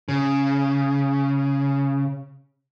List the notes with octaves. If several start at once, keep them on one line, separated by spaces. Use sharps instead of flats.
C#3